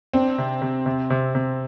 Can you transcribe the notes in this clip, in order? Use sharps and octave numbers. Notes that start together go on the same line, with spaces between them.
C4 D4
C3
C3
C3
C3
C3